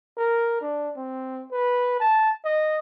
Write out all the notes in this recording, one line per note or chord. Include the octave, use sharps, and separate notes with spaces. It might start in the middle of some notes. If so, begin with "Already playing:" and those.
A#4
D4
C4
B4
A5
D#5